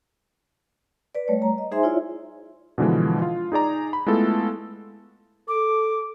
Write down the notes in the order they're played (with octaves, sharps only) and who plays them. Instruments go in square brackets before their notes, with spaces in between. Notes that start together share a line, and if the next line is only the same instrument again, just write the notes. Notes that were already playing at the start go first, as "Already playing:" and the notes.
[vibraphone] B4 D5
G3 A3 C#5
A#5
D#5
D#4 G#4 C5 E5 G#5 C6
E4 F4 C#5 D5 E5
[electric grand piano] B2 D3 E3 F3 G#3
F4
D#4 G#4 D5 A#5
B5
G#3 A3 B3 E4 F4 A4
[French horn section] A4 [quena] D6